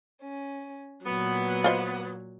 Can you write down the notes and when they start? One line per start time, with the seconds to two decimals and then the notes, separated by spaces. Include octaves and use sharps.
0.21 C#4
1.05 A#2 F#3 B3
1.64 F4 C5 D#5